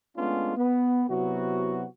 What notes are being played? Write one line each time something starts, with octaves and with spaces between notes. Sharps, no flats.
G#3 A3 B3 C#4 D4 F4
B3
C3 F#3 B3 E4 F#4